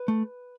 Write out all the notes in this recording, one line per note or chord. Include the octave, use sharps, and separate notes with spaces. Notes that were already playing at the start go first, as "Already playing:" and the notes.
Already playing: B4
A3